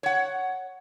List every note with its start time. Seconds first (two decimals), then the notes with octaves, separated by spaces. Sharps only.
0.03 C#5 F#5